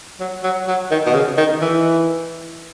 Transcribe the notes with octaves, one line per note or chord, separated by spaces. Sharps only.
F#3
F#3
F#3
D#3
B2
C#3
D#3
E3